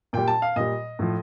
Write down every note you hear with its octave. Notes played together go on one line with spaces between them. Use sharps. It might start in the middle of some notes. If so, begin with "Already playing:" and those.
A#2 G3 G5
A5
F5
A#2 G3 D#5
A2 F3